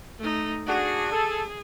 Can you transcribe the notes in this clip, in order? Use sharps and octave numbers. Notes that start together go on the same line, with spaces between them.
A3 D#4
D4 F#4 G#4
A4